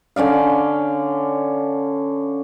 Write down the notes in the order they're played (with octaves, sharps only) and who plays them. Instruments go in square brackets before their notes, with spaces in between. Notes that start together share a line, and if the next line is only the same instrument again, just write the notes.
[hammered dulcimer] D3 C#4 D5 F5